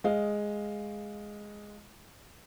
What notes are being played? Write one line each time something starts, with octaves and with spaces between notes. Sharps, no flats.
G#3 D#5 F5